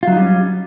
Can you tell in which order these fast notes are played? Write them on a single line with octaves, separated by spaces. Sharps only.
F4 F#3 D#4 G3 C#4